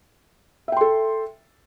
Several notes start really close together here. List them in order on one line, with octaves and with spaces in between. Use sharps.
E5 G5 C6 A4